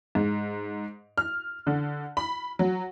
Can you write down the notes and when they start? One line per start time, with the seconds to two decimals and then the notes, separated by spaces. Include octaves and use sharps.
0.15 G#2
1.18 F6
1.67 D3
2.17 B5
2.59 F#3